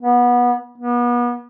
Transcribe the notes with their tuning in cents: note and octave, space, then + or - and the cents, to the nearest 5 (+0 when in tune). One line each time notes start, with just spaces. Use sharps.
B3 -20
B3 -35